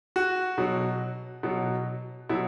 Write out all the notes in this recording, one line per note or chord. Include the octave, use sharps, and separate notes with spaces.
F#4
B2 F#3
B2 F#3
B2 F#3 E4